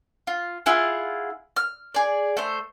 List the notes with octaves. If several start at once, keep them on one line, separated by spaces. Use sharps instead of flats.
F4
E4 F4 G#4 F#5
F6
G#4 D5
A3 C5